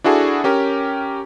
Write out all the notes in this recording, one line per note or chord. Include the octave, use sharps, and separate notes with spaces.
D4 E4 F#4 G#4 A4
C#4 G4 A#4